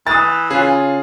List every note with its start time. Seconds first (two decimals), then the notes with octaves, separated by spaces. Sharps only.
0.07 E3 D#6 A6
0.51 C#3 C#4 F4 G#4